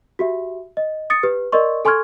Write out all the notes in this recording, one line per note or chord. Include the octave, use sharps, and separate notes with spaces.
F#4 G4 E5
D#5
D#6 A6 C#7
G4 B4
A#4 D5 D#5 C6 C#6
A4 G#5 C6 C#6 F6 G#6